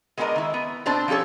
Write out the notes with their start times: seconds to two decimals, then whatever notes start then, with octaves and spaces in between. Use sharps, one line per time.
0.18 G#3 B3 D4 A4 A#4 D#5
0.36 D#3 E4
0.54 B3
0.86 B2 C4 D4 C5 A5
1.08 F3 C#4 G4 A4 C#5